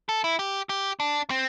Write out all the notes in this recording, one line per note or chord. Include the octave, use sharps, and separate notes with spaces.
A4
E4
G4
G4
D4
C4